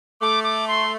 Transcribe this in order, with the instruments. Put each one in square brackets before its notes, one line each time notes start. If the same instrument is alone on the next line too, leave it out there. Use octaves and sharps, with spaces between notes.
[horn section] A3 [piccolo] D6
[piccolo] D6
C6